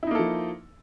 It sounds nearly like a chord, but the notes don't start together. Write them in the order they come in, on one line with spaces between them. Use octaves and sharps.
E4 D#4 A#3 A4 F3